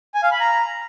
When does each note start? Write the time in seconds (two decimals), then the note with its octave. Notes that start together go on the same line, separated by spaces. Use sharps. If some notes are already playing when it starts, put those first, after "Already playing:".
0.14 G#5
0.23 F5
0.32 B5
0.40 A#5